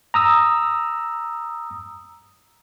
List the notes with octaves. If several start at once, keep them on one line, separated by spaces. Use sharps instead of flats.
A#5 D#6 E6